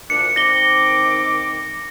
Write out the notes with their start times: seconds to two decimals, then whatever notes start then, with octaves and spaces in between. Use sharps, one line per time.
0.10 D2 A#2 D4 C#7
0.36 D#3 C4 D6 A#6 G7